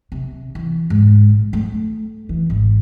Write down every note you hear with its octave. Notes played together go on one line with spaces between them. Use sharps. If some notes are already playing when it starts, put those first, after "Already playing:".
C3
E3
G#2
A#1
A3
E3
G#1